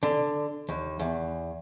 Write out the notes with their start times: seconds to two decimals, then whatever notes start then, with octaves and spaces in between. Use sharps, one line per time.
0.03 D3
0.69 D#2
1.00 E2